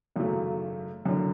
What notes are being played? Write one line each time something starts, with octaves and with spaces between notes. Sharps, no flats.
G#1 F#2 C#3 F#3 A3
F#1 F#2 D3